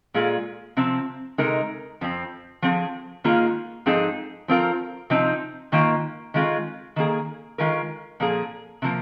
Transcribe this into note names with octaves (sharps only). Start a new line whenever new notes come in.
A#2 G#3 F4 G#4
C3 F3 C4
C3 G#3 D#4 A#4
F2 F3 C4
F3 C4 G#4
G#2 D#3 A#3 F4 G#4
G#2 F3 C4 D#4 G#4
F3 C4 F4 A#4
C3 F3 C4 D#4
G#2 D#3 A#3 F4
D#3 G#3 C4 F4
D#3 A#3 G#4
D#3 G#3 F4 A#4
A#2 F3 A#3 G#4
C3 F3 A#3